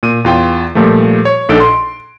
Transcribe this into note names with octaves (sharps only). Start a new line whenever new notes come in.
A#2 D#7
E2 F4 G5
A#2 F3 G3 A3
C#5
A#1 D4 D#4 A4 D7
C6